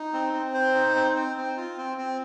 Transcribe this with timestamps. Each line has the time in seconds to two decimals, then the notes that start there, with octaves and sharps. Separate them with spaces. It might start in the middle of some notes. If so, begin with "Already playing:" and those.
Already playing: D#4
0.13 C4
0.33 C4
0.54 C5
0.74 D#4
0.95 C4
1.16 C4
1.37 C4
1.57 F4
1.77 C4
1.97 C4